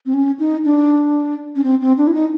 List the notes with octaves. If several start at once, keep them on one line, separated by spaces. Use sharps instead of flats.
C4
C#4
D#4
D4
C#4
C4
C4
D4
E4
D#4